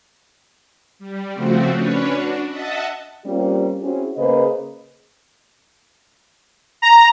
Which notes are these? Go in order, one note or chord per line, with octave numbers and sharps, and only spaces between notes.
G3
C#3 F3 A3 C4 F#4
C#4 D4 B4 C#5
D4 F#4
D#5 E5 F#5 A5
G3 A#3 C4 C#4 F4 G4
C4 C#4 E4 F#4 G#4
C#3 A#3 G#4 B4 C5 D#5
A#5